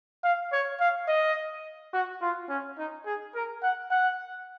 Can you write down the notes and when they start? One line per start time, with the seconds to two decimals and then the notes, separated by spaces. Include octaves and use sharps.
0.24 F5
0.52 C#5
0.80 F5
1.08 D#5
1.93 F#4
2.21 F4
2.49 C#4
2.78 D#4
3.06 G#4
3.35 A#4
3.63 F#5
3.91 F#5